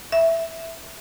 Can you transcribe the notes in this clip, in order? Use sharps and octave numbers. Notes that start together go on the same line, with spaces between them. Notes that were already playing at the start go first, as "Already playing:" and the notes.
E5